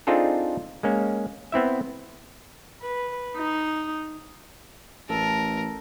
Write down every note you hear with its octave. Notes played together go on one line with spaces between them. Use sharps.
C4 D4 D#4 F4 G#4 A4
G#3 A#3 C#4
B3 C4 E4 E5
B4
D#4
A1 A4 A#4